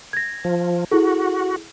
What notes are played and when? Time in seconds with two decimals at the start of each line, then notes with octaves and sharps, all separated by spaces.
0.13 G#6 A#6
0.44 F3
0.91 E4 F#4 G#4 A4